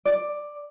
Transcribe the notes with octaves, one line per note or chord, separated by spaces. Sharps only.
D5